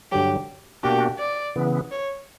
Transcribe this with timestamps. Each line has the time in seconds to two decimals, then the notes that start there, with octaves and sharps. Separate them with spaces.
0.12 G2 D3 F#3 G4
0.83 B2 A#3 D4 F#4 G4
1.19 D5
1.56 C#3 E3 B3
1.91 C#5